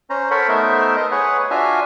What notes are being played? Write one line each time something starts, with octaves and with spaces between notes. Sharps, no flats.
C#4 C5 A#5
A4 A#4 C5 C#5 F#5 B5
A3 B3 D#4 A#4 C5 E5
C5 D#5
G#4 B4 C#5 F#5
D4 F4 F#4 E5 F5 G#5